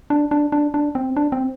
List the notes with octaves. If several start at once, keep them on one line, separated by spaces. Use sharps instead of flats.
D4
D4
D4
D4
C4
D4
C4